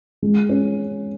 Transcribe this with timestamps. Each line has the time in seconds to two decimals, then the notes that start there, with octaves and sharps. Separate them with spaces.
0.22 G#3
0.49 C#4